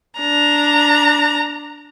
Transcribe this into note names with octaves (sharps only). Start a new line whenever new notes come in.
D4 A#5